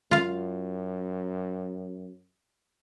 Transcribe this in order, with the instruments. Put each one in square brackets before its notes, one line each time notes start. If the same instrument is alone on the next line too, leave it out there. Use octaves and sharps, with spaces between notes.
[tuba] F#2 [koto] F4 F5